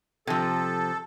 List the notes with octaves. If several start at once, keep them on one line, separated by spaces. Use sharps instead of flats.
C3 F3 A4